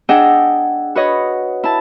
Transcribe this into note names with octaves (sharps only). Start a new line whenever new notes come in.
D4 G#4 D#5 F#5 G5 E6
F#4 B4 C#5 D#5
E4 A5